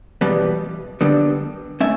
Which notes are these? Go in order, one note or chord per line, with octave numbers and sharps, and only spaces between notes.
E2 B2 G3 B3
D3 G3 B3 D4
A3 C#4 E5